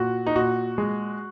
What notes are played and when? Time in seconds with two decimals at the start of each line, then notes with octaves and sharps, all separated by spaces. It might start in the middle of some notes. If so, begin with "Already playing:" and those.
Already playing: A#2 F#4
0.27 D#4
0.36 A#2 F#4
0.78 G#3